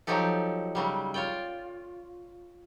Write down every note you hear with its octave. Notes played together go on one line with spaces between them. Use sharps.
F3 F#3 D#4 G4 A4
C#3 F#3 G3
F4 C#5 D5 G5